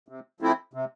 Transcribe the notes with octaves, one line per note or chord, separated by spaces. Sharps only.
C3
F3 A3 C4 E4
C3